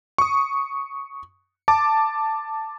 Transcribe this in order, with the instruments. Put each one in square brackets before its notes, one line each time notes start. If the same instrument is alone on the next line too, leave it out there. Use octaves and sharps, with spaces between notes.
[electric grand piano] C#6 D#6
A5 D6